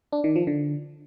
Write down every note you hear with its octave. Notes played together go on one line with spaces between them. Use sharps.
D4
D#3
F3
D3